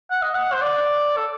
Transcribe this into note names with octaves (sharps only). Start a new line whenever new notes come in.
F#5
D#5
F#5
C5
D5
A4